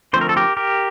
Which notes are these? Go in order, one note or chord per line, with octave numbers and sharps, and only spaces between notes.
D3 F3 A3 C4 C5
A#4
A4
G4 A#4
G4 A#4